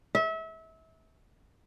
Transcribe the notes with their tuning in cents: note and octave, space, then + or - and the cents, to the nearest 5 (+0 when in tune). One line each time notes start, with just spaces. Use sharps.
E5 -30